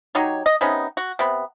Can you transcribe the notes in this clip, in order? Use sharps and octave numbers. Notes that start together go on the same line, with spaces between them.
F#3 D#4 G4 C#5
D#5
C3 B3 C#4 D#4
F#4
C3 B3